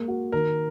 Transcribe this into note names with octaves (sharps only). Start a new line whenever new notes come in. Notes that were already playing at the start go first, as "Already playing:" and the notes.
Already playing: G#3 A#3
F#4
D#3 A#4